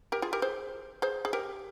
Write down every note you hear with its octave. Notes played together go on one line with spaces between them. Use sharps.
G4 A#4
F4 G#4
G4 A#4
G#4 C5
G#4 C5
G#4
G4 A#4